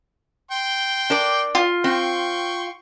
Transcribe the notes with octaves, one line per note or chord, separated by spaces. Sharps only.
G5 C6
D4 A#4 D5
F4
C4 G5 C6 C#6